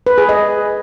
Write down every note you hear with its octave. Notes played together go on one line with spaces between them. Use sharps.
B4
G#4
D#5